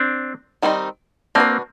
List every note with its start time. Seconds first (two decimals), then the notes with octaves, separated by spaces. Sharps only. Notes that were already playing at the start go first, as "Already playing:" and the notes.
Already playing: C4 D4
0.62 D#3 G3 C4 D#4
1.35 A#3 C4 D4 F#4 B4